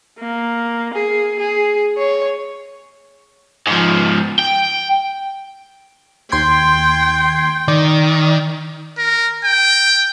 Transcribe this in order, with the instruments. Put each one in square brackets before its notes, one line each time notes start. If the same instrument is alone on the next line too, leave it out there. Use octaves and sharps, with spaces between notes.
[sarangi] A#3
G#4
G#4
C#5
[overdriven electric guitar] G#2 F3
G5
[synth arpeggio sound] D#2 C6 G#6 [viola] G5
[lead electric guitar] D#3 [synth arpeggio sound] D5
[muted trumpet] A#4
G5